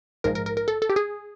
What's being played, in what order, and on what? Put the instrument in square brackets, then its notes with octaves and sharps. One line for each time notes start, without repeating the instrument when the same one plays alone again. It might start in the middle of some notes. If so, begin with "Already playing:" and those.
[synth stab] A#1 G#2 F3 G#3 A#4
A#4
A#4
A#4
A4
A4
G4
G#4